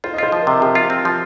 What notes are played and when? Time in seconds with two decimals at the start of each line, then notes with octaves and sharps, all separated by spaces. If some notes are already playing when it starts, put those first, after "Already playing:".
0.04 F4 C5
0.13 D#5
0.18 F4 C5
0.32 F3
0.42 A#4
0.47 C3
0.62 F3 G4
0.75 F4
0.90 C4
1.05 F3